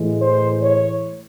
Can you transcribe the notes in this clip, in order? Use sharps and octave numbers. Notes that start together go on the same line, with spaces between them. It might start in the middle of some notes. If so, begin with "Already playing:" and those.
Already playing: A2 E3 G#3
C5
C#5